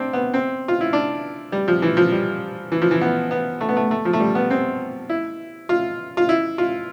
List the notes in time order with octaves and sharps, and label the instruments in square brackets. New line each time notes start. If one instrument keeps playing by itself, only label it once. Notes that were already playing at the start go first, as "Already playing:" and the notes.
Already playing: [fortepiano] C4 D4
B3
C4
F4
E4
D4
G3
F3
E3
F3
G3
E3
F3
E3
B3
B3
A3
B3
A3
A3
F3
A3
G3
B3
C4
E4
F4
F4
E4
F4